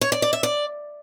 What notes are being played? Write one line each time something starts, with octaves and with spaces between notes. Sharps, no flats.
C#5
D5
D5
E5
D5